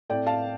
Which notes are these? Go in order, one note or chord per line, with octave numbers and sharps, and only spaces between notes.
A2 A3 C4 D5 G5
F5 A5